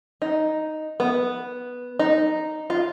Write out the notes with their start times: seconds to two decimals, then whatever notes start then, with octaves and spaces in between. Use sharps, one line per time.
0.22 D#4
1.00 B3
1.99 D#4
2.70 F4